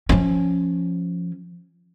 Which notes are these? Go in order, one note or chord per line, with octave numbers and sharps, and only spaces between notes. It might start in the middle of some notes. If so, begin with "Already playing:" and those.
F3 C#4